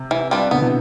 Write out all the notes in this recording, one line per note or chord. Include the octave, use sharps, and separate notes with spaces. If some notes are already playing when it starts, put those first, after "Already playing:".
Already playing: C3
E3
G3 D4 F4 B4
B2 D3 B3
C3 E3